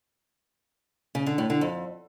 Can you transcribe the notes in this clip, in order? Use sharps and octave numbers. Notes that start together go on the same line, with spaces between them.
C#3
D3
A2
D3
F2